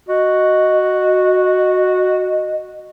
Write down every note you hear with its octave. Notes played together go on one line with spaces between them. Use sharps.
F#4 D#5